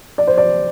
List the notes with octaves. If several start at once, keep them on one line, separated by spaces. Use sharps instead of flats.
D5
C5
D5